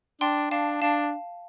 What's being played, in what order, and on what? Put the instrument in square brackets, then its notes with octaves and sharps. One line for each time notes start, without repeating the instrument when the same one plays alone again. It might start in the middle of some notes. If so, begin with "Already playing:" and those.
[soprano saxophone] D4 [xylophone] G5 C6
[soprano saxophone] D4 [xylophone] F5 A5
[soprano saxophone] D4 [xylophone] F5 A5